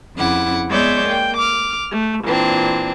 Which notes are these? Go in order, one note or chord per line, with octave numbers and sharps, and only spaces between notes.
F2 C#3 E4 F#5 D6
G#3 B3 C#5 D5 E5 G6
A#3 G5
D6 F6
A3
A#2 E3 C4 D4